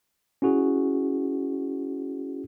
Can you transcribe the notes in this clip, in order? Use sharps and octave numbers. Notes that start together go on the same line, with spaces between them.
C#4 E4 F#4 G#4